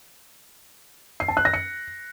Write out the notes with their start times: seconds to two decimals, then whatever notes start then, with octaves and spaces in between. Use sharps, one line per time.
1.20 C7
1.28 A5
1.37 F#6
1.45 A#6
1.53 C#7